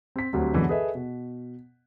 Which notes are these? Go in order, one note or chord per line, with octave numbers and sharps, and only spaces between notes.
C4 B6
D2 F#3 G3 C4
F#2 B2 D3 E3 F#3 G#3
G#4 A4 B4 D#5 E5
B2